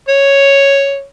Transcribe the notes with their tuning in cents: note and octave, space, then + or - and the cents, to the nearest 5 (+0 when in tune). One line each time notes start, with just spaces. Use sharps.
C#5 +0